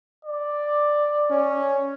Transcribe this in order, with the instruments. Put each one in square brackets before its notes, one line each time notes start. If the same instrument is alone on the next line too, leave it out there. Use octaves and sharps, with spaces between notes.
[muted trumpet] D5
[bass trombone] C#4